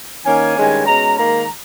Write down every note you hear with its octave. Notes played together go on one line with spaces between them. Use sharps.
D#3 A#3 C#4 G#5
G2 D#3 G#3 C#4
B2 G#3 C#4 A#5
G#2 D#3 A#3 A#5